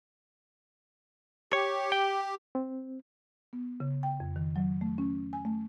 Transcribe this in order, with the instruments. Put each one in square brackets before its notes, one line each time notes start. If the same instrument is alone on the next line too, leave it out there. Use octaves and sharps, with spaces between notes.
[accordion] G4 [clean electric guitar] C#5
[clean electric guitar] G5
[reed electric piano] C4
[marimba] B3
C#3
G5
F2
D#3
F#3
A3
C#4
G#5
A3